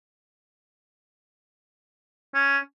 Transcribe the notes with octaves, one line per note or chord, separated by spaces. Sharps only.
C#4